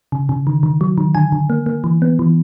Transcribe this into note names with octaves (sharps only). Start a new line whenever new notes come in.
C#3
C#3
D#3
D#3
F#3
D#3
D3 G#5
D3
A#3
A#3
E3
B3
E3